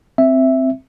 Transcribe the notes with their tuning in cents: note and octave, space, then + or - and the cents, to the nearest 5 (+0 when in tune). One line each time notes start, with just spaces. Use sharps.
C4 +0 E5 +0